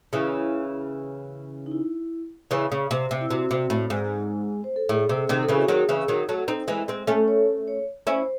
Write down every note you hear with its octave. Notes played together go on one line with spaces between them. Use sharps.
C#3 E3 E4
D#4
E4
C#3 E3
C#3
C3
C3
E4
C3 F#4
C3
A2
G#2
C5
A4
A2 G#4
C3
G#4
C3 D#3
A4
C#3 E3 G#4
F#4
D#3 F#3 G#4
C#3 E3
D#3 F#3
F#3 A3
C4 D#4
E3 G#3
G#3 C4
A3 C#4
C#5
C#5
C#4 E4 C5